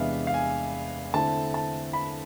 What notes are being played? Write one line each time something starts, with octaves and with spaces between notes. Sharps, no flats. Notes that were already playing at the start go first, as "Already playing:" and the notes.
Already playing: E2 C3 G#3 B3 D4 E5 F5
F5
G#5
D3 A3 C4 E4 A5
A5
B5